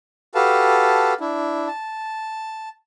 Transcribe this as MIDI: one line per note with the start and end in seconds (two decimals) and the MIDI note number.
0.35 1.14 66
0.35 1.14 67
0.35 1.14 69
0.35 1.14 71
0.35 1.14 77
0.35 1.14 81
1.20 1.68 62
1.20 1.68 64
1.68 2.69 81